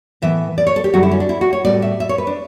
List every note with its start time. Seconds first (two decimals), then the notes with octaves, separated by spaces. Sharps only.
0.22 A2 E3 B3 E5
0.58 D5
0.67 C#5
0.76 A4
0.84 G4
0.94 F#2 D3 G3 F#4
1.03 E4
1.11 C#4
1.20 D4
1.29 E4
1.41 F#4
1.53 C#5
1.65 A2 G3 B3 D5
1.82 E5
2.00 E5
2.09 C#5
2.18 B4
2.27 D4